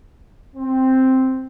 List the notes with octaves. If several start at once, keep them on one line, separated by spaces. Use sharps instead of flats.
C4